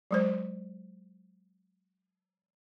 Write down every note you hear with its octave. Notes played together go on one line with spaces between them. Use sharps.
F#3 G#3 C5